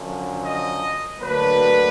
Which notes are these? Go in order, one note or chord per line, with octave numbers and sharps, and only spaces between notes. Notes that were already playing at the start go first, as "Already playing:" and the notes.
Already playing: F#2 D3 F3
D#5
D2 D3 F#3 A#3 D4 B4